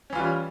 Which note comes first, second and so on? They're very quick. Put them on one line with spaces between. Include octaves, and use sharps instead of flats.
C#4 E3 F4 G3